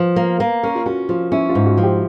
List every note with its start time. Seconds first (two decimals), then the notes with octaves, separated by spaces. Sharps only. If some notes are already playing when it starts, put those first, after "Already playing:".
Already playing: F3
0.16 A#3
0.40 A#3
0.63 C#4 A#4
0.75 F4
0.86 C#4 F#4
1.09 F3 F4
1.32 C#4 E4
1.49 F4
1.55 G#2
1.66 F#4
1.78 F3
1.83 G4